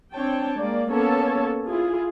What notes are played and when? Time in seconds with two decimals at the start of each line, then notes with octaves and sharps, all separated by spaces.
0.13 C4 D4 C#5 G5 A5
0.59 G#3 A#3 D5
0.92 A#3 B3 C#4 A4 C#5 A5
1.69 E4 F4 G#4